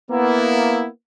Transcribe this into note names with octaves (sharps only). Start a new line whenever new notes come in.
A#3 B3 E4